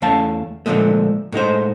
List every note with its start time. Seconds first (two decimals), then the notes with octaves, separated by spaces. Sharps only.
0.02 E2 E3 A3 C#4 F5 A5
0.66 A#2 D3 D#3 F3 G#3 A3
1.32 A2 G#3 D#4 C5